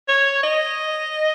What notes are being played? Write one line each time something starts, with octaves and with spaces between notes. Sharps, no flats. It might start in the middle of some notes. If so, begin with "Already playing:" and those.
C#5
D#5